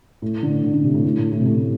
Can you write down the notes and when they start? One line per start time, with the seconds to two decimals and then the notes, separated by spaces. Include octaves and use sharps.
0.22 A2
0.43 D3
0.63 D3
0.74 D3
0.84 C3
0.94 A2
1.04 A2
1.18 A2
1.32 A2
1.40 C3
1.45 A2